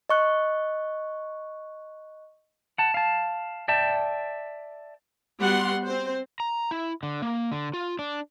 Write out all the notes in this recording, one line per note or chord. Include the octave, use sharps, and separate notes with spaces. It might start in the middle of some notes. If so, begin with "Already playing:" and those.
D#5 C#6 F#6
F#5 A5
F5 A5
D5 E5 G5 A5
G3 B3 F#4 F#5 C6
C4 C5
A#5
E4
D3
A#3
D3
F4
D4